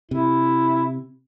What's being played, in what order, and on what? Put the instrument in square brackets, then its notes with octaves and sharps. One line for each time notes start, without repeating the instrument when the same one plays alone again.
[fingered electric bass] C3 [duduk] E4